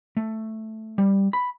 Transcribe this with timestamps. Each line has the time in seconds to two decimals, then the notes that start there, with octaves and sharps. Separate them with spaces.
0.17 A3
0.98 G3
1.33 B5